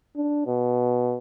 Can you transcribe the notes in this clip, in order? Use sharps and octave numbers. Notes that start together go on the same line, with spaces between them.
D4
B2